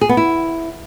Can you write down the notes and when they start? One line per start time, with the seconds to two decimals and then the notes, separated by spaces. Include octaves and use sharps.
0.01 G#4
0.09 B3
0.17 E4